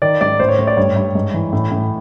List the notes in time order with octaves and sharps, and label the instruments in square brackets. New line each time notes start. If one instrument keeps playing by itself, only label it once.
[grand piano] D#3 D5
G#2 D5
A2 C5
C#5
A2 C#5
D5
G2 C#5
G2
G#2
E3
A2
A2